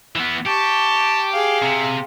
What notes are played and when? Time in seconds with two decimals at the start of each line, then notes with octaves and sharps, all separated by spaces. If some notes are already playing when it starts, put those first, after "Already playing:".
0.16 E3 B3
0.46 G4 A5 C#6
1.32 G#4 F5
1.62 C3